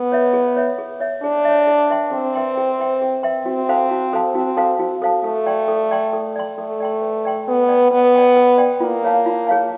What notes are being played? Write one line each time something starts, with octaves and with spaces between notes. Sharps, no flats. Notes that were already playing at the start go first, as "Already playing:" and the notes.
Already playing: B3
C#5 E5
G#4
C#5 E5
G#4
C#5 E5
D4 G#4
C#5 E5
G#4
B4 E5 G5 C6
C4 G#4
B4 E5 G5 C6
G#4
B4 E5 G5 C6
G#4
B4 E5 G5 C6
C4 F#4
A4 C5 F5 A5
F#4
A4 C5 F5 A5
C4 F#4
A4 C5 F5 A5
F#4
A4 C5 F5 A5
A3 A4
D5 G5 C6
A4
D5 G5 C6
A4
D5 G5 C6
A3 A4
D5 G5 C6
B4
D5 G5 C6
B3 B4
D5 G5 C6
B3 B4
D5 G5 C6
B4
D5 G5 C6
A#3 F4
G#4 C#5 F5 A5
F4
G#4 C#5 F5 A5